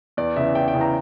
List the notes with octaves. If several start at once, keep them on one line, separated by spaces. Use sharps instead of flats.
E2 D5
C#3 E3 E5
E2 G5
G5
C#3 E3
A#5